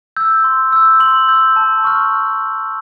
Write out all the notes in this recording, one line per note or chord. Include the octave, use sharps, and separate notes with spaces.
E6 G6
C6
E6 G6
C6 F#7
E6 G6
A5
C#6 F6